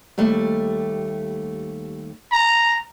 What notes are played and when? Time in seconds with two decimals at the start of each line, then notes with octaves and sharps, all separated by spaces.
0.18 D#2 G3 A3
2.32 A#5